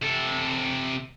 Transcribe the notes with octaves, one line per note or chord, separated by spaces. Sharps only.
C3 A4